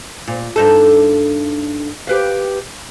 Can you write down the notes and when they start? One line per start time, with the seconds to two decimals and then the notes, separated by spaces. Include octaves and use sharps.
0.28 A#2
0.56 G2 D#4 A4
2.07 G4 B4 F5